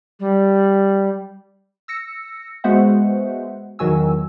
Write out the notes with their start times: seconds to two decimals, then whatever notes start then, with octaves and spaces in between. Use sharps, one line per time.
0.20 G3
1.88 E6 A#6 C#7
2.64 G#3 B3 F#4 C5 E5 F#5
3.79 E2 D#3 F#3 F#4 G#5 E6